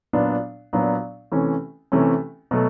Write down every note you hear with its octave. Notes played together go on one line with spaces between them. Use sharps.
A#2 F#3 B3 D4
A#2 F#3 B3 D4
C3 E3 A3 C#4
C3 E3 A3 C#4
B2 F#3 A3